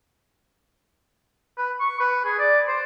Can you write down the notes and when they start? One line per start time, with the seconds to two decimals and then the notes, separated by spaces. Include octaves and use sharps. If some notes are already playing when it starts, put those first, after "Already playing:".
1.57 B4
1.80 C#6
2.00 B4
2.25 G#4
2.39 D5
2.67 C5